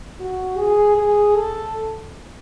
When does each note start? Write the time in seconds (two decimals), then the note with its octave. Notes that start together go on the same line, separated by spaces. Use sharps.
0.20 F#4
0.59 G#4
0.98 G#4
1.36 A4